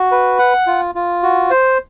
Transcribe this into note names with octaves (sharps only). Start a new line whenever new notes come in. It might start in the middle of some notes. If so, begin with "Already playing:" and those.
Already playing: F#4
B4
F#5
F4
F4
F#4
C5